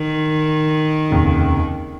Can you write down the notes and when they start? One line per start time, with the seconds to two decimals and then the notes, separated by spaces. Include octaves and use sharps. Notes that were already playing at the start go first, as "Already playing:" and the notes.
Already playing: D#3
1.10 F1 D#2 C#3